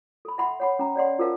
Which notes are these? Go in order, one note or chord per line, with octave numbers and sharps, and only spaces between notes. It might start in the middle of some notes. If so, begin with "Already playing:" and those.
A4 B5
E5 F#5 B5 C6
C#5 F#5 B5
C#4 A#5
C#5 D5 F#5 C6
F4 G#4 A#4 C5 F5 A5